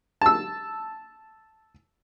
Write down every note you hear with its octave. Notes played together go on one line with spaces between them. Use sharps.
A5 E6